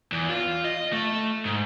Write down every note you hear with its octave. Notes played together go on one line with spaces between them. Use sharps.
E2
F4
D#5
A3
G#2